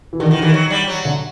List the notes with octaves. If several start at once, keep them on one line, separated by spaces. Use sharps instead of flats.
E3
D3 D#3
D#3 E3
D#3 E3
F#3
G3
F#3
D3